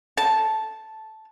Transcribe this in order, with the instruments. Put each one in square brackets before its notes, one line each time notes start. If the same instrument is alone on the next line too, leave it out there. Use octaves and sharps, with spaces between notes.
[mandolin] A5